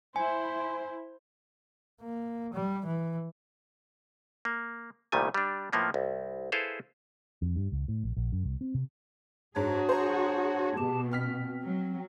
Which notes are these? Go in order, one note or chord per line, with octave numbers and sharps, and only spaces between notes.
E4 C5 G#5
A#3
G3
E3
A#3
C2 A#2 D#3 G3 A3 G#5
G3 D4
A2 F3 A#3 B3
C2
E4 G#4 A4 B4 C5 F5
F2
G2
C#2
A2
A#1
A#1
F#2
C2
C4
C3
G#2 D4 F#4 G#4 C#5
C5 A#5
B2 G4 A5
C4 F6 B6
F#3